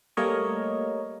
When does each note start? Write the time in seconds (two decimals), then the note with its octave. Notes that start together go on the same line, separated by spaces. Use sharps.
0.17 G3 A3 A#3 A#4 C#5 D#5